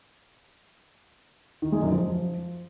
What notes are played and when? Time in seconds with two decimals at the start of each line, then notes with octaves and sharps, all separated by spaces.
1.62 D#3
1.72 G#3
1.82 F#2
1.92 F3